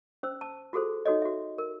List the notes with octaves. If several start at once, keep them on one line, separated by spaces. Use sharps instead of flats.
C#4 C5 E6
A5
F4 F#4 G#4 A4 C5
D#4 F#4 A4 C#5 D#5
F#4 E5
A#4